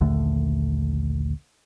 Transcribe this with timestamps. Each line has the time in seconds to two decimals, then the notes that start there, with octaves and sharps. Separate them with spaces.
0.01 A#1 D#2 D3 A3